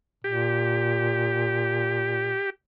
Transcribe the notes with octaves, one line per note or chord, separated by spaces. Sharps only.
A#2 G4